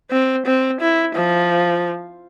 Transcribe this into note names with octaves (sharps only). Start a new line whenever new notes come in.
C4
C4
E4
F3